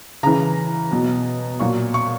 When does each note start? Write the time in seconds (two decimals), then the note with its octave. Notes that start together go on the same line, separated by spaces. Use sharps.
0.23 C#3 E3 A#5
0.91 B2 F#3
1.60 A#2 F#3 C#6
1.94 C#6